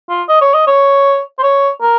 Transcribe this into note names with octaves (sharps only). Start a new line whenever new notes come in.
F4
D#5
C#5
D#5
C#5
C5
C#5
A#4